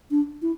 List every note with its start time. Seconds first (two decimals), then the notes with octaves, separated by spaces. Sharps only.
0.11 D4
0.42 E4